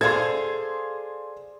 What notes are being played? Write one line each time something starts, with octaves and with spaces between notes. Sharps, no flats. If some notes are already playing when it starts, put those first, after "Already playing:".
G#4 A4 C5 D5 F5 C6 G#6